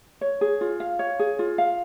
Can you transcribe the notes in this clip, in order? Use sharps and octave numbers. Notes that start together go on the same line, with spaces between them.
C#5
G#4
F4
F5
C#5
G#4
F4
F5